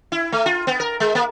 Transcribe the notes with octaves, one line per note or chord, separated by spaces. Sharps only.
E4
A3
F4
B3
A#4
G#3
A#3